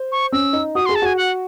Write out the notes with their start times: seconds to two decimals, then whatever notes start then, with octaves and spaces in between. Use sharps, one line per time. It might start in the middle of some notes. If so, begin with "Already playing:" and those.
Already playing: C5
0.12 C#6
0.32 C#4 E6
0.53 D#4
0.75 F#4 D#6
0.86 C6
0.89 G#4
0.95 A5
1.02 F#4 G#5
1.17 F#5